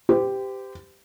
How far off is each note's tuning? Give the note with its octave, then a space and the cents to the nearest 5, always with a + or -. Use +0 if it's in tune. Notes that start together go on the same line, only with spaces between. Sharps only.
G4 +0 C5 -40